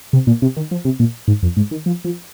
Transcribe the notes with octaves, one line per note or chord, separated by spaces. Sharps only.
C3
A#2
C3
D#3
F3
C3
A#2
G#2
F2
G#2
D#3
F3
F3